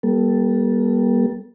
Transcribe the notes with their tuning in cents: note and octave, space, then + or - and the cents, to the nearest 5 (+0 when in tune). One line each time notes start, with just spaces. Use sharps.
G3 +0 A#3 +45 A4 +0